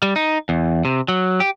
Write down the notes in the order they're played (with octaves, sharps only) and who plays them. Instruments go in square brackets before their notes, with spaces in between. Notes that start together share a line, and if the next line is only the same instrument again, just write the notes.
[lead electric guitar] G3
D#4
E2
C3
F#3
G4